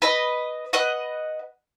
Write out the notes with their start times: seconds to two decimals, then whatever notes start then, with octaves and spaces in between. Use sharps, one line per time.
0.02 B4 D#5
0.73 B4 D#5 F#5